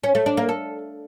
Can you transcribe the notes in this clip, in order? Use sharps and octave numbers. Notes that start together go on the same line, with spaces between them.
C#4
A3
D4
A#3
A4